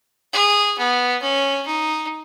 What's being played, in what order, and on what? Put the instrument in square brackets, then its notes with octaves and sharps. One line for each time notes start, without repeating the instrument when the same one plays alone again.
[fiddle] G#4
B3
C#4
D#4